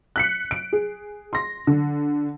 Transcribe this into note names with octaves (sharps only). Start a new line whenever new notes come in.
F#6 B6 C#7
D7
G#4
C6 A#6
D3